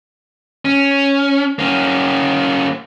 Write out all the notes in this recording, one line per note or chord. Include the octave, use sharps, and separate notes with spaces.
C#4
A#3 C#4